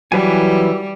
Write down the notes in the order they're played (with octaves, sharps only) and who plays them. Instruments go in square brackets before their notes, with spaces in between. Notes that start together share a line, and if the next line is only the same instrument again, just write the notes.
[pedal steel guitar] E3 B4 G#5 [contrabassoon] F#3 [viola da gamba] G3